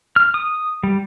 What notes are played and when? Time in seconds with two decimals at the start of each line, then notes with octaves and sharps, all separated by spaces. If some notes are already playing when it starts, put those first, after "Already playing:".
0.16 F6
0.34 D#6
0.83 G3